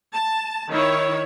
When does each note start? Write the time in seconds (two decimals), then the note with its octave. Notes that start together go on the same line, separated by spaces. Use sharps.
0.13 A5
0.71 D#3 E4 C#5